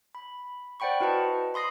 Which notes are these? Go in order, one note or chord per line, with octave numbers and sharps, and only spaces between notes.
B5
C5 D5 F#5 G5 B5 C#6
E4 F#4 B4 D#5 A5
B5 C6 D#6 A#6 C7